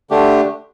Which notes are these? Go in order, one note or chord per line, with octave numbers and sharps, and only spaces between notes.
D3 A3 D4 G4